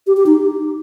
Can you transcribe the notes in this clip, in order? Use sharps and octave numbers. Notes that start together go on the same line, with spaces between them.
G4
G4
D#4